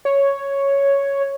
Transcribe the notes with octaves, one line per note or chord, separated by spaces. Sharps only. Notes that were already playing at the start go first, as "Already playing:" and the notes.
C#5